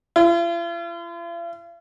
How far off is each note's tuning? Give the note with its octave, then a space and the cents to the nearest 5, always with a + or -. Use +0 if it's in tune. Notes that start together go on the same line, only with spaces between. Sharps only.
F4 -45